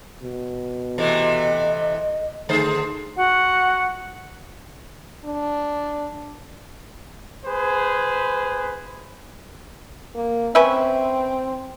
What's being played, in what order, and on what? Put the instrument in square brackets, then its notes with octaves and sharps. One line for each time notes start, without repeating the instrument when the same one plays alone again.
[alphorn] B2
[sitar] C3 E3 A3 [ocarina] D#5
[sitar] D3 G#4 C5 [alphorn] A3
[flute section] F#4 F#5
[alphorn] D4
[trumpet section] G#4 B4 C5
[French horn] A#3
[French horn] C4 [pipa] C#4 B4 E5